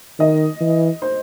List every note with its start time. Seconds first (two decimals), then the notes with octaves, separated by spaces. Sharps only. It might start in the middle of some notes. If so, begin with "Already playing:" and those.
0.19 D#3 D#5
0.61 E3
1.02 C5